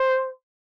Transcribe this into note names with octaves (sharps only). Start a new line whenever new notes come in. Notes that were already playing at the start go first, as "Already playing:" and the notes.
Already playing: C5